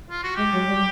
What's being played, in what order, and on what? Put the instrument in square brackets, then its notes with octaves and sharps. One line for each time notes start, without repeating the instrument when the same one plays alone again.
[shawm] F4
F#4
[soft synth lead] G#3 [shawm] G4
[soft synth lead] F#3
G3